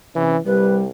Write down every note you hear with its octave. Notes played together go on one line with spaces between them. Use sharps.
C3 E3 C#4
C2 G3 B4